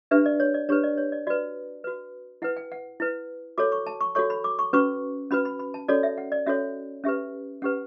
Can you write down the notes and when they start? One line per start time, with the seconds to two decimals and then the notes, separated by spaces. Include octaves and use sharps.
0.11 D4 G4 B4 E5
0.26 D5
0.40 C#5
0.54 D5
0.69 D4 G4 B4 C#5
0.83 D5
0.97 C#5
1.12 D5
1.27 F#4 B4 D5
1.84 F#4 B4
2.42 E4 B4 F#5
2.57 G5
2.72 F#5
3.00 E4 B4
3.58 F#4 A4 C#5 D6
3.72 C#6
3.87 A5
4.01 C#6
4.15 F#4 A4 C#5 C#6
4.30 B5
4.44 D6
4.59 C#6
4.73 C#4 F#4 B4 C#6
5.31 C#4 F#4 B4 B5
5.45 B5
5.59 B5
5.74 A5
5.88 C#4 F#4 A4 C#5 D5
6.03 E5
6.18 F#5
6.32 D5
6.46 C#4 F#4 A4 C#5 E5
7.04 C#4 G4 B4 E5
7.62 C#4 G4 B4 F#5